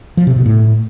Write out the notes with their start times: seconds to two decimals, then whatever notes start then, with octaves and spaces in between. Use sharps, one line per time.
0.17 F3
0.27 C3
0.36 B2
0.46 A2